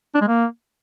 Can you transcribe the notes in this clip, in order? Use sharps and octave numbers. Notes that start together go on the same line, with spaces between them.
D4
G#3
A#3